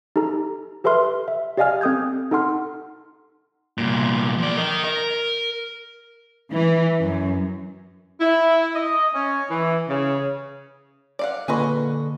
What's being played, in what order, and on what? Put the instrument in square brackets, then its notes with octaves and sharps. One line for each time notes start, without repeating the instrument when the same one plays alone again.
[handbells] D#4 G4 A4 A#5
G4 A4 B4 E5 C6 F6
E5
G4 D5 D#5 F5 G#5 F6
C4 A4 D#6 G6 G#6
D#4 A4 F#5 C6 F6
[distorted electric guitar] C2 A#2
F3 D5
A#4 D#5
A#4
[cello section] E3
F#2
[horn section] E4
D#5
C#4
E3
C#3
[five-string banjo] D5 F5 F#5
[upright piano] A#2 C#6 [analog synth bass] D3 [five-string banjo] G#4 B4 D#5